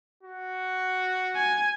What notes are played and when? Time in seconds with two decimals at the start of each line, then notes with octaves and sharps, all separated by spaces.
0.23 F#4
1.36 G#5